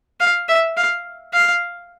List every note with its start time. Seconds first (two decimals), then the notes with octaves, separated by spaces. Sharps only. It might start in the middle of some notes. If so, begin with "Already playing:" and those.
0.20 F5
0.49 E5
0.77 F5
1.34 F5